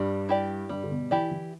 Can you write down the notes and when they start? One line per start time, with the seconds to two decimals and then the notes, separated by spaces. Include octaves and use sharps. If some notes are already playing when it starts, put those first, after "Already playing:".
Already playing: G2 G3
0.29 E4 G4 D5
0.69 G2 G3
0.84 D3
0.91 B2
1.11 E3 E4 G4 D5
1.31 E3